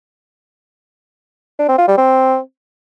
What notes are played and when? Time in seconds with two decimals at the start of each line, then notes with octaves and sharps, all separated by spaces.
1.59 D4
1.69 C4
1.78 F4
1.88 G3
1.97 C4